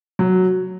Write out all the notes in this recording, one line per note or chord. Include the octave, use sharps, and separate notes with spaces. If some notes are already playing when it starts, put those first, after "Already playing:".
F#3